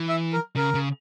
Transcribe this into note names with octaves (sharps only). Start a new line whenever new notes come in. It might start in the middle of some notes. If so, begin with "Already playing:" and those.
Already playing: E3
E5
A#4
C#3 A#4
C#3